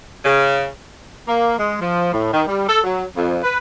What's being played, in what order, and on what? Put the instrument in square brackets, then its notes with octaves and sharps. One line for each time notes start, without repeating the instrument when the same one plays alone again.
[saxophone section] C#3
A#3
G#3
F3
A2
D#3
G3
A4
F#3
F2
B4